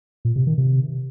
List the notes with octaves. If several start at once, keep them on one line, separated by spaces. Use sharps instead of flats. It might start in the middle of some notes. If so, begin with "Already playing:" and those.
A#2
C3
D#3
C3